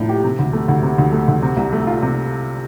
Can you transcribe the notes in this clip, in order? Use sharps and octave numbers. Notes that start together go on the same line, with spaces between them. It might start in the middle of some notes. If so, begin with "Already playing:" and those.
Already playing: A2 F3 D4
G4
C3
D2
A3
D2
C3
D2
A3
D2
C3
C2
A3
F4
C3